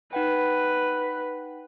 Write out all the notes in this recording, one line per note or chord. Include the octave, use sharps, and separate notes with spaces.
D#4 B4 F#5 G5